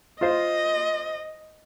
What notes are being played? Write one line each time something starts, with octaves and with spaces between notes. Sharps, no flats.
F4 C5 D#5